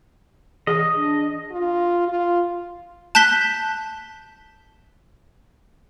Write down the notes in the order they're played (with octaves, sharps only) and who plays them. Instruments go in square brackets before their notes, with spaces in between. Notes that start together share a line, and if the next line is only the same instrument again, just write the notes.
[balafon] E3 G#4 [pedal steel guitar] D#5
[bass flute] D4
[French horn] F4
F4
[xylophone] A5 F#6 G6 B6 G7